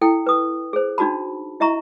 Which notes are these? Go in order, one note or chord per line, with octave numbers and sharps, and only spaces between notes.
E4 A4 G5
B4 D#6
G#4 C5
D4 D#4 F#4 A5 B5
E4 D#5 E5 A#5 C#6